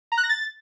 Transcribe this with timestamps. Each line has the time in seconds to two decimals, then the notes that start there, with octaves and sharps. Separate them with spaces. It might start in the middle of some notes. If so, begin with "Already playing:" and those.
0.12 A#5
0.18 F#6
0.23 A#6
0.29 A6